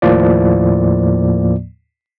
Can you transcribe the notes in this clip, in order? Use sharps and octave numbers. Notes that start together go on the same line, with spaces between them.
D#2 A2 F3 A#3 D5